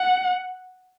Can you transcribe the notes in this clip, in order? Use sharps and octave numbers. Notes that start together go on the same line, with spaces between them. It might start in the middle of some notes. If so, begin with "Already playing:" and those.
Already playing: F#5